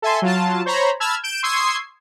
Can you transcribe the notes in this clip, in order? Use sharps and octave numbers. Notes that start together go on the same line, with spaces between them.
A4 E5 G#5 C6
F#3 F4 A5
C5 C#5 A#5 B5
A5 B5 E6 F6 G#6
G6 D7 E7
C6 C#6 D#6 E6 G#6 C7